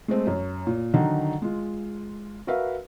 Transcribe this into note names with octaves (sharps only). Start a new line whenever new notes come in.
G#3 A3 C4
F#2
A#2
D3 D#3 F#3 D#4
G#3 F4
F#4 A#4 B4 E5 F5